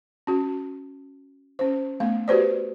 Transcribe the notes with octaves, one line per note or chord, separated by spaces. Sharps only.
C#4 F#4
C#4 C5
A3 B3 F5
F#4 G4 B4 C5 D5